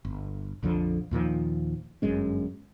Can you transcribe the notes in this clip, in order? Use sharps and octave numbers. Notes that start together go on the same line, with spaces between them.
G1
A#1 F2 D3 F3
D#2 A#2 D#3 F3
G1 F#2 G#3 C#4